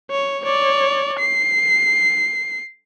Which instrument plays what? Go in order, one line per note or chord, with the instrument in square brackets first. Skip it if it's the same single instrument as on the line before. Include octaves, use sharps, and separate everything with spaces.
[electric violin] C#5
C#5 D5
C7